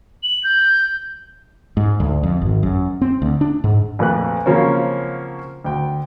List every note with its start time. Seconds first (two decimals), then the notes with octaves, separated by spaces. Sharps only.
0.23 F#7
0.43 G6
1.77 G#2
2.00 D2
2.23 F2
2.42 G#1
2.63 F#2
3.01 C4
3.22 D2
3.41 D4
3.64 G#2
3.99 A#1 F2 A3 B4 F#6
4.46 C#3 F3 F#3 A#3 C4 C#4
5.65 D2 G5